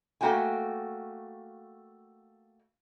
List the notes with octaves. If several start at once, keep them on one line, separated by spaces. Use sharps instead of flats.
A3 A#3 F#4 G5 G#5